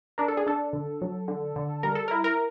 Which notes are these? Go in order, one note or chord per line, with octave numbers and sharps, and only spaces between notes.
D4 A#4
A4
G#4
D4 A4
D3
F#3
D3
D3
G3 A#4
A4
E4 A#4
A#4